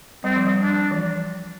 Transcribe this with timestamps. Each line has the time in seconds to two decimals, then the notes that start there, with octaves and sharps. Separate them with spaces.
0.24 G3 C4
0.36 F3
0.47 G3
0.61 D4
0.91 E3
0.97 F3